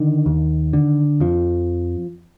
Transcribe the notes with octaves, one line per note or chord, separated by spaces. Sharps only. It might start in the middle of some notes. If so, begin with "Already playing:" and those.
Already playing: D3 D#3
D#2
D3
F2 F3